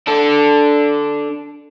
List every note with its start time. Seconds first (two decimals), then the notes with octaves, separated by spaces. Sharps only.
0.07 D4 A4